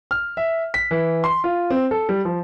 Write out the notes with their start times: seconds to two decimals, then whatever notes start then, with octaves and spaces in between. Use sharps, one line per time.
0.11 F6
0.37 E5
0.74 B6
0.91 E3
1.24 C6
1.44 F4
1.70 C4
1.91 A4
2.09 G3
2.25 F3